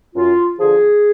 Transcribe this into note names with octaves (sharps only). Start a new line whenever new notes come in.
F#2 F4
D3 F3 G#4